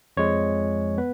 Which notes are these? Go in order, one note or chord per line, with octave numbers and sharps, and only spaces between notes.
F2 F3 G#3 C#5
B3 B4